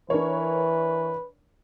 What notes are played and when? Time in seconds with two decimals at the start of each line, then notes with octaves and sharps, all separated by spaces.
0.10 E3 D4 A#4 B4 C#5